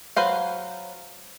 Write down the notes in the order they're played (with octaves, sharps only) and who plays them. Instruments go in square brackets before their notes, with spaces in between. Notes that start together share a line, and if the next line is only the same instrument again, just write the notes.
[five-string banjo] F#3 B4 C5 F5